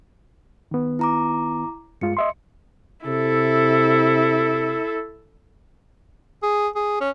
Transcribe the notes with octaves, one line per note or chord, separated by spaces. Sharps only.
D#3 B3
E4 A#5 D6
G2 G#3 F4 C#7
D#5 E5 C6
C3 E4 A4
G#4
G#4
C#4